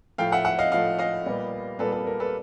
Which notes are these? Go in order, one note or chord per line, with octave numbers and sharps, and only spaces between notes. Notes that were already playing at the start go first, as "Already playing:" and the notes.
A2 F3 A3 F5 G5
E5 F#5
E5 F#5
D#5 F5
A2 F3 A3 D#5 F5
D#5 F5
A#2 G3 B3
A#2 G3 B3 A4 B4
A4
A#4
A4 B4